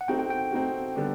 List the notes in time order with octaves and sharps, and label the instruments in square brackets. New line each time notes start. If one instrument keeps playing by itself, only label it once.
[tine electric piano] F#5
[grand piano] A3 C4 D#4 F#4 [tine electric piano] G5
[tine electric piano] G5
G5
[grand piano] A3 C4 D#4 F#4
D3 G3 B3 D4